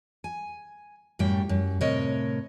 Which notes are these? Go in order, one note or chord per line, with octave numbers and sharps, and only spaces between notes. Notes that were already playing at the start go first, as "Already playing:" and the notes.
G#5
F#2 A2 G3 G5
F#2
A2 C3 A#4 C#5 D#5